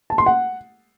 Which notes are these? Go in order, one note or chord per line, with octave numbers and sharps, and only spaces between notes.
A5
C6
F#5